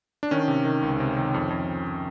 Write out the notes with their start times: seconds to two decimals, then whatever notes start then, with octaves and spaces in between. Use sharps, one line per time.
0.23 D4
0.31 D#3 C#4
0.48 C3
0.65 D#3
0.82 C#2
1.00 C3
1.17 D#3
1.34 F2
1.50 F2